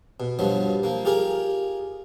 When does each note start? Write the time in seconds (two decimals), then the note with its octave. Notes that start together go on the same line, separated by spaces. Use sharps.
0.20 B2
0.39 G2 B2 F3 F#3
0.83 F3 A#3
1.05 F4 G4 G#4 A#4